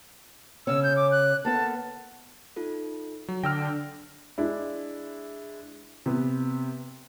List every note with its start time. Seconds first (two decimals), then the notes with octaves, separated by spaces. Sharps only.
0.67 C#3 C#4 E6
0.83 G6
0.96 D6
1.12 F#6
1.45 A#3 B3 A4 A5
2.56 D#4 F4 A4
3.28 F#3
3.44 D3 G5 E6 F6 A#6
4.38 G#3 D4 E4
6.06 C3 B3